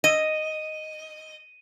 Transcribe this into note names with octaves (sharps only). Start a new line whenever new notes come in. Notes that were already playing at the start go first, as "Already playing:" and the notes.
D#5 D#7